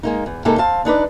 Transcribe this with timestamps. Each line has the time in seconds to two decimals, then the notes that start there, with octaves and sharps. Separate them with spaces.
0.03 G#3 A#3 D#4
0.26 E2
0.45 C3 G#3 A#3 D#4 A4
0.58 C4 F5 A5
0.85 D4 D#4 B4 D5